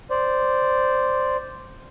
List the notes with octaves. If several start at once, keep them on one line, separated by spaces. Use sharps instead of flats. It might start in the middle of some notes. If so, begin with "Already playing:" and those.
C5 D5